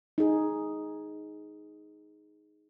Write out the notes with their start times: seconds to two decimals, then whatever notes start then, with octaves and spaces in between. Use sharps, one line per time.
0.18 D#4 G#4